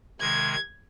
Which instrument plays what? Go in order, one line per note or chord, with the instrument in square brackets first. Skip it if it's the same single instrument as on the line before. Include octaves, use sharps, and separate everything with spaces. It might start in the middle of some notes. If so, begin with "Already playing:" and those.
[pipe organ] C3 D#3 G#3 [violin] G#6